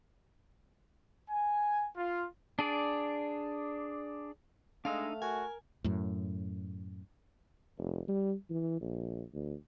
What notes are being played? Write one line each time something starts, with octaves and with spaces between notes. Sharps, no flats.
G#5
F4
D4 G#4 D5
G#3 A3 D4 D#4 F5 E6
F#4 A#4 G#5
F#2 A2
F1
G3
E3
A#1
D2